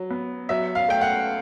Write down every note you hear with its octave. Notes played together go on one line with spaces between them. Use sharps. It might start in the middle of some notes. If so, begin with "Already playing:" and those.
Already playing: F#3
B3
F#3 E5
F5
A3 G5
F#5